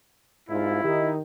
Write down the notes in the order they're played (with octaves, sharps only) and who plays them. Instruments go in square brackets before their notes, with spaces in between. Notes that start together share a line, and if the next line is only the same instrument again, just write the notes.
[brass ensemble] C2 F4 [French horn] G#2 [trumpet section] E4
[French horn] D#3 [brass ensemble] D#4 [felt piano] G4